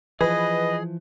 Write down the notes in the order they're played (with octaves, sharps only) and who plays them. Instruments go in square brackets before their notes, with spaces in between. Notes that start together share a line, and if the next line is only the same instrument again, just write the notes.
[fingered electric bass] E3 F3 [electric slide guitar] G#4 [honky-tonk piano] B4 [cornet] D#5